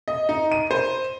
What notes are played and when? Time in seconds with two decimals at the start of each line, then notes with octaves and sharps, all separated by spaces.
0.08 D#5
0.29 D#4
0.52 D#7
0.71 C5